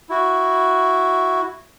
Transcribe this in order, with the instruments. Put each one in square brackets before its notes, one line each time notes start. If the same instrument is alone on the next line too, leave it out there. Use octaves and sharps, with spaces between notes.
[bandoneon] E4 F#4